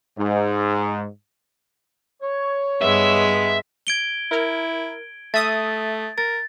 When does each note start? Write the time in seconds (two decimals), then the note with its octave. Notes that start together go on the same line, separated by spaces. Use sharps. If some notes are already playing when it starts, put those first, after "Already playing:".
0.18 G#2
2.22 C#5
2.81 G2 G#3 B3 E5
3.87 G#6 D7 G7
4.32 E4 A#4
5.34 A3 E5 D#6 A6
6.18 A#4 A6